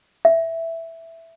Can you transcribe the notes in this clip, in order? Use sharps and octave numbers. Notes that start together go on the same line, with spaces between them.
E5